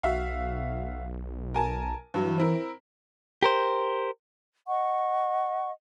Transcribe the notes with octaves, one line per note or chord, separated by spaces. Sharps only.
B1 F#4 E5 F5
A#4 G#5 A5
G2 E3 F#3
C4 E4 A#4
G4 A#4 C5
D#5 F#5 C#6